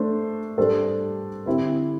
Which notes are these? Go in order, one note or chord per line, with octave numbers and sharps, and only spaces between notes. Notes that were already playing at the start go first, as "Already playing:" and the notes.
Already playing: A3 D4 C5
G3 D4 A4 C5
D3 C4 E4 G4